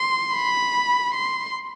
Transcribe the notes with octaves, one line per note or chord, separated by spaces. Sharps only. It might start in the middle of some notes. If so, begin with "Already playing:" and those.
Already playing: C6
B5
C6